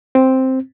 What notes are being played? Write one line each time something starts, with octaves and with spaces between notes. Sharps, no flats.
C4